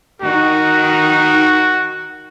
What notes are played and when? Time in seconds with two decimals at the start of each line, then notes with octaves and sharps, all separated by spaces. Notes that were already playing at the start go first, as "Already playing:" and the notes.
0.22 D#3 D#4 F#4 A#4